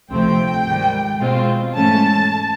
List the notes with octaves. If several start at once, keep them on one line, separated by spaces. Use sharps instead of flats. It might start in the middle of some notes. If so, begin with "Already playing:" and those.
D2 C3 F3 A3 C4 G5
G#2 D#3 G3
B2 G#3 C4 F4
G#2 E3 A3 C#4 A5